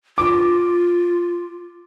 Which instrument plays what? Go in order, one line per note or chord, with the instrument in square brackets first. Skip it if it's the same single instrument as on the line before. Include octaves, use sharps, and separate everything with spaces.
[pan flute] F4 [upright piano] D6